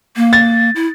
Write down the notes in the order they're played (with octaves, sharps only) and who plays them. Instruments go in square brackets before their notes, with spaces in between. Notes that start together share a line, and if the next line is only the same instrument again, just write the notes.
[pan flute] A#3
[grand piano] A6
[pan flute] E4